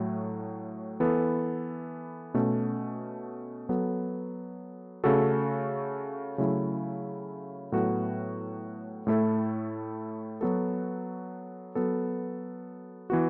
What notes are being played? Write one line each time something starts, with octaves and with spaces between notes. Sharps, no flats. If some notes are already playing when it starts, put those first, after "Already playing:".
Already playing: A2 F#3 A3
E3 B3 A4
B2 A3 C#4
F#3 B3 A4
C#3 A3 F#4 A4
C#3 F#3 A3 E4
A2 F#3 B3 F#4 A4
A2 A3 E4 A4
F#3 B3 F#4 A4
F#3 B3 A4
E3 B3 F#4